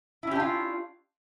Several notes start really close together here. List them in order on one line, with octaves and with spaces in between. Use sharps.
E4 C#4 G4 D4 F4